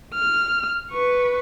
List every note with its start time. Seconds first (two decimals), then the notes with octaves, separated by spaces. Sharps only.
0.15 F6
0.91 B4 C#6